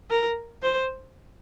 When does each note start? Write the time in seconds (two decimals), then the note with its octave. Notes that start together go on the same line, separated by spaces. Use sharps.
0.10 A#4
0.62 C5